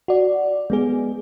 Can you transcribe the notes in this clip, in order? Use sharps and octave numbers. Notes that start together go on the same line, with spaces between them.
F#4 D5
G#3 B3 G#4